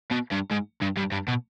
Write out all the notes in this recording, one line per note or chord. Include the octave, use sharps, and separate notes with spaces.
B2
G2
G#2
G2
G2
G2
B2